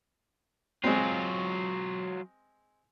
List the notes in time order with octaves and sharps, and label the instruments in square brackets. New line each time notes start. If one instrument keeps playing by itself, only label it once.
[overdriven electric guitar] F#3 F4 [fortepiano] G#3 C4